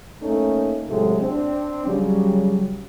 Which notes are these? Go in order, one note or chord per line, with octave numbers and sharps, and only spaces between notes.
A3 A#3 C#4 D#4 A4
A2 C3 F#3 G#3 A3
C4 D4
C#3 F#3 G3